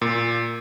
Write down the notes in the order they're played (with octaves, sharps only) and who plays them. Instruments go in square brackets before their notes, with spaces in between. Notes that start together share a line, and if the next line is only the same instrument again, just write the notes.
[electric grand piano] A#2